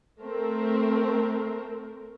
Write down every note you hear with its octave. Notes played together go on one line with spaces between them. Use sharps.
A3 C4 A#4